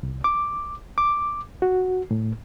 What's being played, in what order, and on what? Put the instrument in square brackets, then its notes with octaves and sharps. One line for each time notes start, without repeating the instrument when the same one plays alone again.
[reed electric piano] C2
D6
D6
F#4
A2